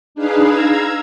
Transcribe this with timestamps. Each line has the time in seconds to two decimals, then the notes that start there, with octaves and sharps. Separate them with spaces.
0.15 D4 D#4 G#4 B4 F5
0.45 F5 A#5 E6 G#6